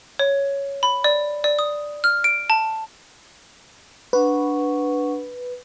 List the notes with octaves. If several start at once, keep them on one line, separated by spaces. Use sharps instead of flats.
C#5
B5
D5
D5
D#6
F6
D7
A5
D4 B4 F#5 C#6